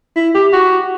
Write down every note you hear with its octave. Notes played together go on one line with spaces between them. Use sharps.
E4
G4
F#4